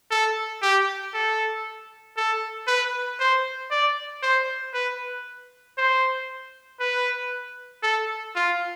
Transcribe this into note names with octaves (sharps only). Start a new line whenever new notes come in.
A4
G4
A4
A4
B4
C5
D5
C5
B4
C5
B4
A4
F4